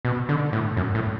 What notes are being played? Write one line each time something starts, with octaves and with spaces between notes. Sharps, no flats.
B2
D3
A2
F#2
A2